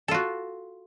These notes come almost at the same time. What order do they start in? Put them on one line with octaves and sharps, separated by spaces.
A4 F4 F#4